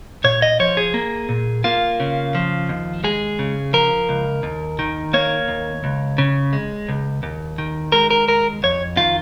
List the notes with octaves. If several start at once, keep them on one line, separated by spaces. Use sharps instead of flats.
A#2 C#5
D#5
F3 C#5
G#4
A#3
A#2
A#3 F4
C#3
F3
D#2
G#3 G#4
C#3
F3 A#4
C#2
D#2
D#3
A#3 C#5
D#2
C#2
C#3
G#3
C#2
D#2
D#3
G#3 A#4
A#4
D#2 A#4
F2 C#5
D#3 F4